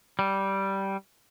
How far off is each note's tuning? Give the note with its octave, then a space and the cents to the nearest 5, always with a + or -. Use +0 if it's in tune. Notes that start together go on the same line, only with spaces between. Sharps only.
G3 -10